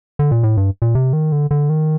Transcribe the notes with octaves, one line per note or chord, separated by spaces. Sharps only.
D3
A#2
A2
G2
A#2
C3
D#3
D3
D3
D#3